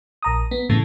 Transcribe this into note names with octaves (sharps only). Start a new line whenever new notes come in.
A#1 A#5 D#6
B3
A2 C#3 E3 A3